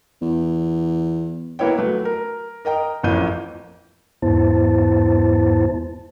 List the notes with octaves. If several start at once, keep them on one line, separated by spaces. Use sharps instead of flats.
E2
A#3 B3 E4 C#5 G5
F#3 A3 B4
A#4
A#4 D#5 G5 A#5
A1 F2 A2 A#3 G6 D#7
E2 G#2 B3 E4 C5 A5